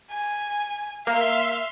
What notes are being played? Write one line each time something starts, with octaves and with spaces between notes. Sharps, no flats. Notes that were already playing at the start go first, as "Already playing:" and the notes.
G#5
A#3 E5 F5 C6